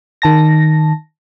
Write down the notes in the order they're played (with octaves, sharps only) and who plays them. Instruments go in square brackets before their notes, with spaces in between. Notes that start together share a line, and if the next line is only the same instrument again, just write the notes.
[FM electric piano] D#3 A5 A#6